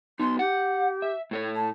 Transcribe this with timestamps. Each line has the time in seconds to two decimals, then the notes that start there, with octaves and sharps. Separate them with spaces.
0.19 B3 D#4 C6
0.39 G4 F#5
1.02 E5
1.31 A2 A4 C#5
1.55 A5